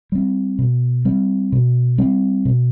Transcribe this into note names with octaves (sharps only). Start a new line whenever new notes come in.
G3 C4
B2
G3 C4
B2
G3 C4
B2